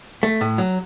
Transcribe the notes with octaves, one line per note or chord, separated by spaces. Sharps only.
A3
A2
F#3